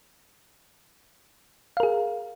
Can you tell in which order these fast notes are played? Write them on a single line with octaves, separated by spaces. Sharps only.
F5 A#4 G#4